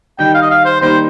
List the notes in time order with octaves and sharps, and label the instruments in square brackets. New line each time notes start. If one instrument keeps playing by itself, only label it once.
[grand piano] D#3 G3 D#4 [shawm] G5
[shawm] F5
D#5
F5
C5
[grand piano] D#3 G3 A#3 D#4 [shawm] C5